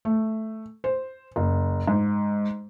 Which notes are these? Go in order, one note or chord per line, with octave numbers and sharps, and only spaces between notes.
A3
C5
F#1
G#2